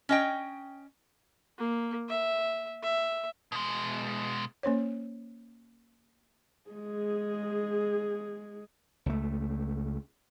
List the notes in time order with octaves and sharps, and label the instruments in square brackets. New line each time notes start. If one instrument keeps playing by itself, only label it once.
[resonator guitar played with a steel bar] C#4 D#5 G5
[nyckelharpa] A#3
E5
E5
[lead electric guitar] B2 G#3
[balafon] A#3 C#4 C5 C#5
[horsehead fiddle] G#3 G#4
[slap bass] C#2 A3